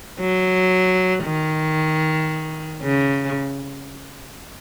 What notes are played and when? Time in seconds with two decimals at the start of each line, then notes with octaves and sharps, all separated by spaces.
0.19 F#3
1.25 D#3
2.83 C#3